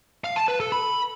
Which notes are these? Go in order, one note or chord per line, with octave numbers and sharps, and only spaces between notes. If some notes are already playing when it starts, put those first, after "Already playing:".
F5
A5
B4
A4
B5